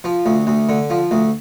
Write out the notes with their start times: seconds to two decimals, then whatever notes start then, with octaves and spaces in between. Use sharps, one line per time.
0.04 F3
0.26 D2
0.47 D2
0.69 D3
0.90 F3
1.11 D2